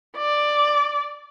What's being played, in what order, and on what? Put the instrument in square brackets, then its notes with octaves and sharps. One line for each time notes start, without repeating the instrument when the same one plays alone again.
[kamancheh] D5